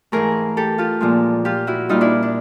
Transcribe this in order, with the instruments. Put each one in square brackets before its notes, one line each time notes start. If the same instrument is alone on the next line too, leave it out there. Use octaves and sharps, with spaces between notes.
[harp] G#2 E3 A3 G#4 A#4
G4 A4
F4 G4
A#2 F3 G#3
F4 G4
E4 F#4
A#2 G3 D#4 F4
D4 E4
D4